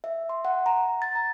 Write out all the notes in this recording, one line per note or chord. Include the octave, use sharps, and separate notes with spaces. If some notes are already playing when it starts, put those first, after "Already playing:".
E5
C6
F#5
A#5
A6
A#5